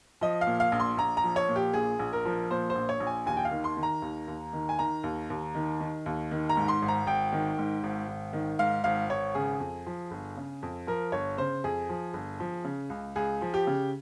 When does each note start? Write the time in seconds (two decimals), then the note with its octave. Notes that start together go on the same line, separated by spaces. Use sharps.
0.21 F3 D#5
0.41 F5
0.47 A#2
0.60 F5
0.72 A#1
0.80 C6
0.97 A#1 A#5
1.17 A#5
1.24 F3
1.36 C#5
1.48 A#2
1.56 G4
1.74 A#1 G#4
1.99 A#1
2.13 A#4
2.25 F3
2.50 A#2 C5
2.70 C5
2.75 A#1
2.89 C#5
3.00 A#1
3.07 G#5
3.26 D#2 G#5
3.37 G5
3.45 F5
3.51 D#3
3.64 C6
3.77 D#3
3.83 A#5
4.02 D#2
4.28 D#2
4.53 D#3
4.69 G#5
4.79 D#3 A#5
5.04 D#2
5.30 D#2
5.55 D#3
5.80 D#3
6.06 D#2
6.31 D#3
6.49 A#5
6.57 G#2
6.68 C6
6.82 G#1
6.88 A#5
7.07 G#1 G5
7.33 D#3
7.58 G#2
7.83 G#1
8.08 G#1
8.33 D#3
8.59 G#2 F5
8.84 G#1 F5
9.10 G#1 C#5
9.35 C#3 G#4
9.60 F2
9.86 F3
10.11 G1
10.37 C#3
10.63 F2
10.87 F3 A#4
11.12 G1 C#5
11.38 C#3 C5
11.64 F2 G#4
11.89 F3
12.14 G1
12.40 F3
12.64 C#3
12.90 C#2
13.16 C#2 G#4
13.42 F3
13.54 G4
13.67 C#3